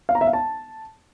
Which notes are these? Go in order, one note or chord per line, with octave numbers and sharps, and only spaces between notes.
F5
A#5
E5
F5
A5